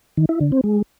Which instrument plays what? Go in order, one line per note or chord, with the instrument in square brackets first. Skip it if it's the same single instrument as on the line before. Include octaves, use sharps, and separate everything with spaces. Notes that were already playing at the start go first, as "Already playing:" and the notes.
[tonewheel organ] D#3
E4
D3
C4
G#3